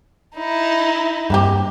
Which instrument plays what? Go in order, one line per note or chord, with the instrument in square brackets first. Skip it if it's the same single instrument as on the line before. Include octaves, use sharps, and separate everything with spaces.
[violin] D#4 E4
[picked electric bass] G2 [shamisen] A#3 C4 G4